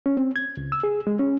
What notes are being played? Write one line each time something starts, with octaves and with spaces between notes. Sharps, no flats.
C#4
C4
G#6
C#2
E6
G#4
G#3
C#4